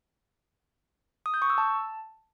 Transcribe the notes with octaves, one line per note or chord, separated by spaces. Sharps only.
D#6
G6
C#6
E6
A5